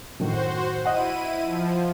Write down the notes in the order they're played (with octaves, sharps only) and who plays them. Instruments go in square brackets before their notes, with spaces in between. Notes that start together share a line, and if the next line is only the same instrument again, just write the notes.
[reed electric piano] F#2 A2 D#3 [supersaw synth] F#4 C5
[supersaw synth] E4 D#7 [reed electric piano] D#5 F#5
[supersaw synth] F3